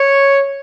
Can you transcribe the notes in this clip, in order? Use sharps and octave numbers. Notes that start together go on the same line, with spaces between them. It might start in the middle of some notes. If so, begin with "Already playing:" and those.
Already playing: C#5